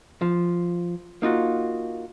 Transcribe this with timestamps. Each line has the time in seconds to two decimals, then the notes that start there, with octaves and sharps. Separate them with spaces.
0.21 F3
1.22 A#3 D#4 F4 F#4